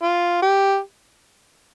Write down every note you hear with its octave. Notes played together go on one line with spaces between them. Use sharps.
F4
G4